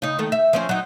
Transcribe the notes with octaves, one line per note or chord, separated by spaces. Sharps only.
C#3 D#4
D#3 A3
E5
F3 C4 C#4
F#3 D#4